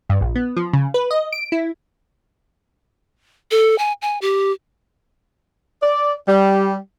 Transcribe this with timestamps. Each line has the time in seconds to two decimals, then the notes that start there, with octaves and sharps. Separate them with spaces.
0.10 G2
0.21 A#1
0.36 B3
0.57 F3
0.73 C#3
0.94 B4
1.11 D#5
1.33 D7
1.52 E4
3.51 A4
3.78 G#5
4.02 G#5
4.22 G4
5.83 D5
6.28 G3